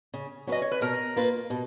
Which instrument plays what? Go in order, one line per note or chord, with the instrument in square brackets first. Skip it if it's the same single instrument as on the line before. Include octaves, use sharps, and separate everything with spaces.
[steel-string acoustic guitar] C#3
[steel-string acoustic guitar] F#3 C#4 F#4 B4 [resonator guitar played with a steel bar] D#5
[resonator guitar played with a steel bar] C#5
B4
[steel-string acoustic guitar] B2 [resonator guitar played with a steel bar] A#4
[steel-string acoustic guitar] A#3 F4 B4
B2